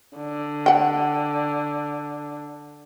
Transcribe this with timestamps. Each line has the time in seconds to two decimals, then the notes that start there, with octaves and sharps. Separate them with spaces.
0.18 D3
0.66 F#5 G5